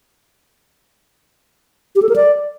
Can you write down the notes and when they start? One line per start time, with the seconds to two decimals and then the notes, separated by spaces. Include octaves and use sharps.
1.96 G4
2.02 A4
2.09 A#4
2.16 D5